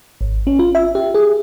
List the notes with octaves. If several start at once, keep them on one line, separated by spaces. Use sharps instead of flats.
G#1
C#4
F4
E5
G4
G#4